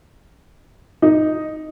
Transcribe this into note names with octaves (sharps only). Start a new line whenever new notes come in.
D#4